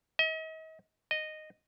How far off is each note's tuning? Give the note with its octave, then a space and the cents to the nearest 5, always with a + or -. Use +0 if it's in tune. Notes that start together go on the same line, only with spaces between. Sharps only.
D#5 +40
D#5 -10